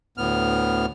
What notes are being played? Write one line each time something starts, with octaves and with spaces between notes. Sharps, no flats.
D2 A2 B3 F6